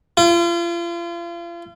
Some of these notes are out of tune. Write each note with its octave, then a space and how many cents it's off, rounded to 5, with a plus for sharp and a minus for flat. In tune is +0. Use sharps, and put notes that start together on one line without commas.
F4 -35